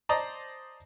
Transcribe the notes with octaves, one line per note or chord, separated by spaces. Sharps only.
C5 D5 D#5 A5 A#5